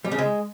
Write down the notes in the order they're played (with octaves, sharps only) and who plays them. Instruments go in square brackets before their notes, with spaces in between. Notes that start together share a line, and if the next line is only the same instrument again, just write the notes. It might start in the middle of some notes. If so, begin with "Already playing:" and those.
[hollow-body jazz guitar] G3
C#3
G#3